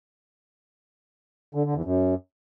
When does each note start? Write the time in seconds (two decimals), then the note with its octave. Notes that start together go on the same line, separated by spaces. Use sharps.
1.55 D3
1.65 D3
1.75 E2
1.85 F#2